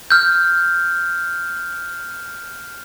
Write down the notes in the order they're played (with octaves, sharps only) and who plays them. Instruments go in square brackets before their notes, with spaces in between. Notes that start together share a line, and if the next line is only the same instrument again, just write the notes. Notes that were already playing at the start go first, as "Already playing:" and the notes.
[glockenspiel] F6 G6